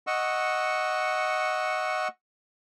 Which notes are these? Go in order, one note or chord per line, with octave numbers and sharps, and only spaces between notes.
D#5 F#5 C#6 E6